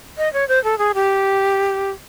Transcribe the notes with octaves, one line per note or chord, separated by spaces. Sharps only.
D#5
C#5
C5
A4
G#4
G4